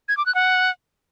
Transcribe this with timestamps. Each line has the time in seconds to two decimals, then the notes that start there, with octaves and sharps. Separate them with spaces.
0.08 G#6
0.17 D6
0.26 F#6
0.35 F#5